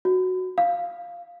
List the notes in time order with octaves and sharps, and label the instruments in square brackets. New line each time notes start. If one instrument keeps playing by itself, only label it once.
[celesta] F#4
F5